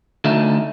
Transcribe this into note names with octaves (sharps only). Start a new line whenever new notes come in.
D3 A3 D#4